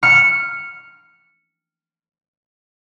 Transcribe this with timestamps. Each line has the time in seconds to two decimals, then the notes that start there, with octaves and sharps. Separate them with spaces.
0.03 F6 C#7